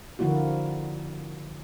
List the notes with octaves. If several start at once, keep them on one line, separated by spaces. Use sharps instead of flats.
D3 F3 A#3 E4 F#4